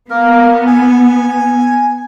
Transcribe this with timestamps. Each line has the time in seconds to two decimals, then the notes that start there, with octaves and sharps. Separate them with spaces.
0.10 A#3 B3 A#4
0.67 G#5